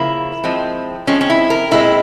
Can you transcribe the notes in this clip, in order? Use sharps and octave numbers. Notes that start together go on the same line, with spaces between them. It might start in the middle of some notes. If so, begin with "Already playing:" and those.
Already playing: C#3 F3 A#3 E4
F3 G#3 C4
F3 G#3 C4 C#4
C#4
E4
A#4
A#2 G#3 C4 E4